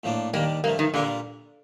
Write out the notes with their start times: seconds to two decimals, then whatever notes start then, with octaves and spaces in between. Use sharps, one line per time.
0.04 A2 F3 A#3 D4
0.33 D#2 D#3 G3 A#3 D4
0.64 G2 F3 A3 A#3
0.79 D#3
0.94 A#2 D3 G3 A#3 F4 A#4